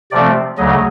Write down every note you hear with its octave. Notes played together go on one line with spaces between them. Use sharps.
C3 F3 A3 C4 D5
D2 C#3 F#3 D#5